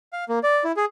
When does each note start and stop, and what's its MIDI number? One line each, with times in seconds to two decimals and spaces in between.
0.13 0.24 77
0.29 0.39 58
0.43 0.64 74
0.64 0.72 64
0.77 0.85 68